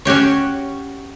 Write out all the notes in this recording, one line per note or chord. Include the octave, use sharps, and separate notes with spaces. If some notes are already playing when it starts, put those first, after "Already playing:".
C#4 F#4 G4 C#5